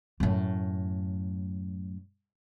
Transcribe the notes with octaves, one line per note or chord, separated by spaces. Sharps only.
F#2 A2